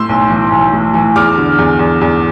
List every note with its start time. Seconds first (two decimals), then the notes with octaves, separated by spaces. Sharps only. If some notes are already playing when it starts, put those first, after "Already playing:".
Already playing: A2 C6 E6
0.09 B1
0.30 E3
0.52 B1
0.73 A2
0.94 E3
1.16 E2 D6 F6
1.37 D3
1.58 E2
1.79 E2
2.01 E2